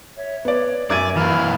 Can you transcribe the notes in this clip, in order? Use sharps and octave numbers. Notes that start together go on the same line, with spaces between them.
C#5 E5
B3 C#5 D5
F#2 D5 E5 G#5 G#6 D#7
E3 A#3 B5 F6